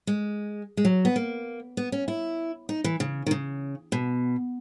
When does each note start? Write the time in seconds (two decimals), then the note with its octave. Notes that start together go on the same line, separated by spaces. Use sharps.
0.07 G#3
0.77 G#3
0.85 F#3
1.05 B3
1.16 A#3
1.77 B3
1.92 C#4
2.08 E4
2.69 D#4
2.84 E3
3.00 C#3
3.26 D#3
3.31 C#3
3.92 B2